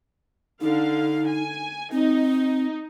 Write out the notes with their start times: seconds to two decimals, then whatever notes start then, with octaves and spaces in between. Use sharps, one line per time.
0.61 D3 D#4 F5
1.28 G#5
1.92 C4 D#4